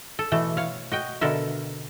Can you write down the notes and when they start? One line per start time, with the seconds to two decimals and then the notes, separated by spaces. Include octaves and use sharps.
0.19 A4
0.32 B2 E3 A3
0.57 C#5 F5
0.91 F#4 D#5 G5
1.21 B2 D3 A4 A#4 E5